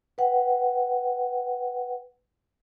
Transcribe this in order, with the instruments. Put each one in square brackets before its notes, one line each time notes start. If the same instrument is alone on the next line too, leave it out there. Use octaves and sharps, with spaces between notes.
[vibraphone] B4 F#5 G5